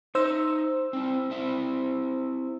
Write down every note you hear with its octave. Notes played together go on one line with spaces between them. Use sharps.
D#4 C5 D#5 E5 E6
C4 E4
C4 E4 E5